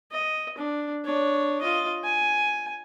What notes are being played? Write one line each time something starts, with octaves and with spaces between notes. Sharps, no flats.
D#5
D4
D4 C#5
F4 D#5
G#5